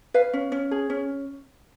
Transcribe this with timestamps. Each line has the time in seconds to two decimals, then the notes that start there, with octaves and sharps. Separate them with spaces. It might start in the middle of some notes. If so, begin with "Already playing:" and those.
0.14 B4 F5
0.33 C#4
0.52 C#4
0.71 G#4
0.90 C#4